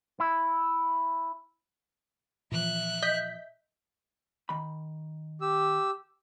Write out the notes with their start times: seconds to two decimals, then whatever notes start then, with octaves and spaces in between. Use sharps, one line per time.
0.20 E4
2.52 A#2 E3 F3 E5 F#6
3.02 D#5 G6 B6
4.49 D#3 B5
5.41 G4 E6